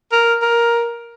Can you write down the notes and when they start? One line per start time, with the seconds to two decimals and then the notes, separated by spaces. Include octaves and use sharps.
0.12 A#4
0.42 A#4